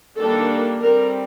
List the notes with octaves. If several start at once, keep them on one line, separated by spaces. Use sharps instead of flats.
D#3 G3 A#3 D4 A4
G3 C4 A#4